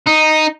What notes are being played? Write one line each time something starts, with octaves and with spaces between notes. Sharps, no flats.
D#4